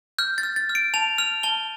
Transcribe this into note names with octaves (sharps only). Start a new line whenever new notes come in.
F6 G6
A6
F6
A6
F6
D7
A5 F7
F6 F7
A5 G7